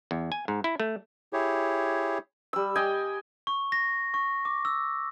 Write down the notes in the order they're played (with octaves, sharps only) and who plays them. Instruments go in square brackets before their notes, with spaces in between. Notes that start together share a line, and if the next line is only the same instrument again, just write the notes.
[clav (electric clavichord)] E2
G#5
G#2
E4
A3
[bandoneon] E4 G4 G#4 C#5
[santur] G3 E6
G4 D#5 G5 G#5
[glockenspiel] C#6
A#6
C#6
D6
E6